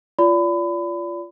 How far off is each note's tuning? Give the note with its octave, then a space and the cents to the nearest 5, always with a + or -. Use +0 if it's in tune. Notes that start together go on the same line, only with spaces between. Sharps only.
F4 -10 D5 -30 B5 +30